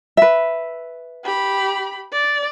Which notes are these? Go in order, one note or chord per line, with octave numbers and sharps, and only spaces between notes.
B4 E5
G4 B5
D5